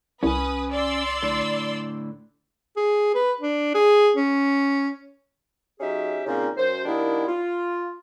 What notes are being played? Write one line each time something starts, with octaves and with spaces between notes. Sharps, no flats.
C2 C#4 B4 G#5 D#6
D5 C6 E6
A2 D3
G#4
B4
D4
G#4
C#4
F#3 C#4 D#4 G4 G#4 E5
A#2 C#3 A#3 C4 C#4 D#4
F#2 C5
D#3 G3 A#3 B3 D4 E4
F4